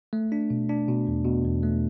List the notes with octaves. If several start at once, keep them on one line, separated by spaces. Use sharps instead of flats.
A3
D4
B2
D4
B2
E2
B2
E2
A3